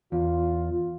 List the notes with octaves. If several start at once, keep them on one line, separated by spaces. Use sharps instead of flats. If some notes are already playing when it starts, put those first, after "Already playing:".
E2 F4